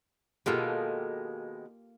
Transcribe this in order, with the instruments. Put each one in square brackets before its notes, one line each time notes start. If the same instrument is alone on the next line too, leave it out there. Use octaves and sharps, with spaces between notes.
[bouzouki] B2 D#3 G#3 [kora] A#3 F4 G5 [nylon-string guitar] G4 A4